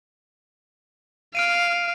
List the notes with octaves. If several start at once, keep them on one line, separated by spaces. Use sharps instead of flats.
F5 F6 D7 D#7